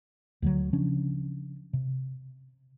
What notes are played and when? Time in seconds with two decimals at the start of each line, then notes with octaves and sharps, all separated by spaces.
0.42 D2 D3 F#3
0.73 C#3 F3 C#4 D4
1.73 C3